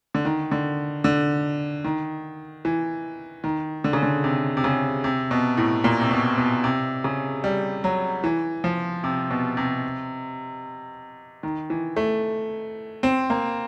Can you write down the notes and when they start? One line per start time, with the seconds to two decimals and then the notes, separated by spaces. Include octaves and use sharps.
0.14 D3
0.25 D#3
0.51 D3
1.04 D3
1.85 D#3
2.65 E3
3.44 D#3
3.84 D3
3.93 C#3
4.03 D3
4.24 C3
4.57 C3
4.64 C#3
5.04 C3
5.31 B2
5.57 A2
5.84 A#2
6.01 C3
6.11 B2
6.37 B2
6.64 C3
7.04 C#3
7.44 G3
7.84 F#3
8.24 E3
8.64 F3
9.04 C3
9.31 B2
9.57 C3
11.43 D#3
11.70 E3
11.96 A3
13.03 C4
13.30 A#3